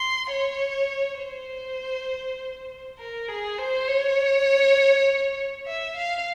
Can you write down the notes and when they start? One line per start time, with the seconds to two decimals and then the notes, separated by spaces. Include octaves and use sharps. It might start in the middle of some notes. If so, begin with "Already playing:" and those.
Already playing: C6
0.31 C#5
1.21 C5
2.98 A#4
3.28 G#4
3.58 C5
3.88 C#5
5.66 E5
5.96 F5